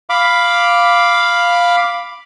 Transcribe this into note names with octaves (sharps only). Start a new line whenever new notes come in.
F5 B5 D6